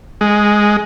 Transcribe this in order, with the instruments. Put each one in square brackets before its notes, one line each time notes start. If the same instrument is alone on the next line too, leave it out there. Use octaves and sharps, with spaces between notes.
[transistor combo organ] G#3